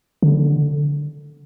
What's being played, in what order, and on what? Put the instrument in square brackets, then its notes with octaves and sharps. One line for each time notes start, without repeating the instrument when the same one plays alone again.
[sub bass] D3